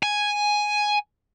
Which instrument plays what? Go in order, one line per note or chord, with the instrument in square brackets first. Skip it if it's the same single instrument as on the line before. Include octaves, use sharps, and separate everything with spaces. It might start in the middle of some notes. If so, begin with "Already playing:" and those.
[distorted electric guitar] G#5